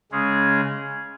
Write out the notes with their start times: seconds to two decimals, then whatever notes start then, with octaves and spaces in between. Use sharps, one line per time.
0.12 C#3 G#3 C#4 G#4